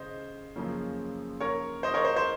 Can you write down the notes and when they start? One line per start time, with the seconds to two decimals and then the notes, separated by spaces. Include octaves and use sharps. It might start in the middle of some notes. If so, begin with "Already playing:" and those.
Already playing: C#3 C5 D#5
0.56 F#2 C#3 F3 A#3 C#4
1.40 A#4 C#5
1.83 C5 D#5
1.94 A#4 C#5
2.05 C5
2.16 C5